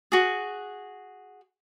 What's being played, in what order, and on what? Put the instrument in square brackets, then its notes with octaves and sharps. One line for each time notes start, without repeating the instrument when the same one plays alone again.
[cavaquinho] F#4 G#4